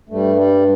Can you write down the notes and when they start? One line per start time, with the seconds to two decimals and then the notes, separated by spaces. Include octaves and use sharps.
0.09 G2 G3 A3
0.36 G3